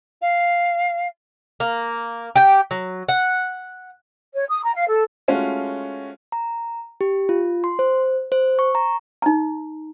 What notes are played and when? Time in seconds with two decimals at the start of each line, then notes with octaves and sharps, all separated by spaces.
0.21 F5
1.60 A#3
2.36 G4 G5
2.71 F#3
3.09 F#5
4.34 C#5
4.48 D#6
4.63 A#5
4.75 F5
4.88 A4
5.28 G#3 A3 C#4 F4 F#4
6.32 A#5
7.01 G4
7.29 F4
7.64 C6
7.79 C5
8.32 C5
8.59 C#6
8.75 A#5
9.22 D#4 A#5